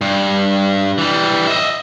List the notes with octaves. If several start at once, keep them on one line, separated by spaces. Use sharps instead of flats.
G2
E3 G3
D#5 E5